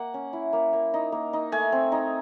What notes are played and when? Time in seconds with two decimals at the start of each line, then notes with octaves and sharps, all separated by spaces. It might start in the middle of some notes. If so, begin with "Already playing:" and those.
Already playing: A#3 F#5
0.14 C#4
0.33 E4
0.53 A#3
0.73 A#3
0.94 D#4
1.12 A#3
1.33 D#4
1.52 A3 G#5
1.72 C4
1.92 D#4